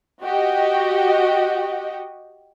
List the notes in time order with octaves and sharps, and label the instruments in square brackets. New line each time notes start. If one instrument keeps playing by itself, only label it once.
[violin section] F#4 G4 D#5